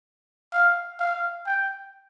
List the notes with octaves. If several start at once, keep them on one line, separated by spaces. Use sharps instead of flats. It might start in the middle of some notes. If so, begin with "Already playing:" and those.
F5
F5
G5